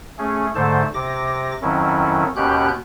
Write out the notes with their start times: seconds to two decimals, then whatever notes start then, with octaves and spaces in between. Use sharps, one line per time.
0.18 A3 C#4 G#4
0.55 G#2 D3 A3 A4 C5 A5
0.94 C3 D6 A#6
1.62 F2 D#3 F#3 C#4 E4
2.36 D#2 B2 C#4 G4 F#6 G6